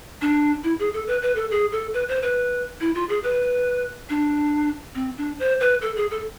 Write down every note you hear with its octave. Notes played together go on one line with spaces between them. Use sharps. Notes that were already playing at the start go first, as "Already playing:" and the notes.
D4
E4
G#4
A4
B4
B4
A4
G#4
A4
B4
C5
B4
E4
F4
G#4
B4
D4
C4
D4
C5
B4
A4
G#4
A4